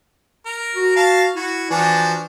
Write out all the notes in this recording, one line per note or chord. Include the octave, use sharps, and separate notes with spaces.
A#4
F#4
F5 A5
E4 F#4
E3 F3 D4 F#4